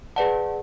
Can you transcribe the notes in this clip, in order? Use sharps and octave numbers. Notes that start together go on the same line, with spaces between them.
G#4 B4 D5 F#5 A5